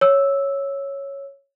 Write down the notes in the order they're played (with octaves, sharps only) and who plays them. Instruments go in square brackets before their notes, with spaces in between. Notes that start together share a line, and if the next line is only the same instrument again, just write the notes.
[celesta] C#5 E6